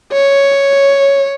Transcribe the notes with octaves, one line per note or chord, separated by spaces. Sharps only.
C#5